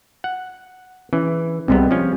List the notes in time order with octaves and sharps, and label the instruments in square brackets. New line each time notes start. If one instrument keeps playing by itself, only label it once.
[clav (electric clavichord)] F#5
[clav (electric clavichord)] E3 [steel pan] C#4
[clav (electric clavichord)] C2 C3 B3 [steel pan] G3 G#3 C4
[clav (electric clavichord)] F3 C#4